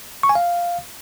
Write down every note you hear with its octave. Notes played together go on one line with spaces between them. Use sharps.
C#6
G#5
F5